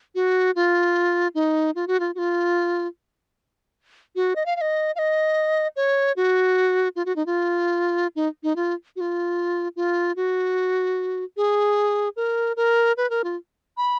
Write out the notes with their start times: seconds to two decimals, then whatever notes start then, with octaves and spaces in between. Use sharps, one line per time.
0.15 F#4
0.56 F4
1.35 D#4
1.75 F4
1.87 F#4
2.00 F4
2.15 F#4
2.18 F4
4.16 F#4
4.36 D#5
4.46 F5
4.56 F5
4.61 D#5
4.96 F5
4.99 D#5
5.76 C#5
6.17 F#4
6.96 F4
7.06 F#4
7.16 D#4
7.26 F4
8.16 D#4
8.43 D#4
8.56 F4
8.96 F#4
9.01 F4
9.76 F4
10.16 F#4
11.37 G#4
12.16 A#4
12.57 A#4
12.97 B4
13.10 A#4
13.24 F4
13.77 B5